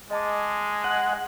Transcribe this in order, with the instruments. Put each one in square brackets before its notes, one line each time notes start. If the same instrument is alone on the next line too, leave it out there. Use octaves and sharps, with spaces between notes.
[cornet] G#3 [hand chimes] D#5 A5 D6
[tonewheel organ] F#5